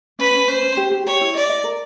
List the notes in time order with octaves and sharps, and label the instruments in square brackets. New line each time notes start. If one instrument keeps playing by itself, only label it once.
[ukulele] C#4 [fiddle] B4
[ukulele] C#4
[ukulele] C#4 [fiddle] C5
[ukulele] C#4
G4
G4
[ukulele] G4 [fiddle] C#5
[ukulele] E4
[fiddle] D5 [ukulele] D#5
[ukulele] D#5
A#4